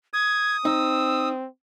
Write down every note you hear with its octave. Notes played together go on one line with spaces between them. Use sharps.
D#6 G#6
C4 D#4 E6